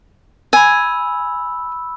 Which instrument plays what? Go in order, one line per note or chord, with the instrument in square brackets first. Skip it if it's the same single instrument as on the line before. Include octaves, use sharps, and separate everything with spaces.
[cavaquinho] G#5 [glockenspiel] B5 E6